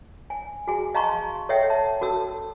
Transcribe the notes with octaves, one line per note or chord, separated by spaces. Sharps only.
G#5
F#4 G#4 G#5
D#5 F5 A5 A#5 C6 C#6
A4 C#5 D#5 E5 F#5 G5
A5
F#4 A4 A5 E6